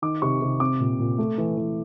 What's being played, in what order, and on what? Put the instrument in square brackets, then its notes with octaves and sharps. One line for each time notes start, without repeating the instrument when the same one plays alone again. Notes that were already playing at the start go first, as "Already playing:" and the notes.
[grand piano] D#3 D6
C3 C#6
C3
C4 D6
A#2
A#2
A3
E3
E3